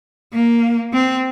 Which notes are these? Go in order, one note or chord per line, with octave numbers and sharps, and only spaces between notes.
A#3
C4